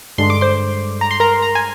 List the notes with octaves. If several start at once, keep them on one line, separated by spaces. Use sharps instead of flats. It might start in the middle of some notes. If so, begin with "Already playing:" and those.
G2 D3 G#3 D4 C6
D6
C5 C6
A#5
C6
A#4 A#5
A#5
G#5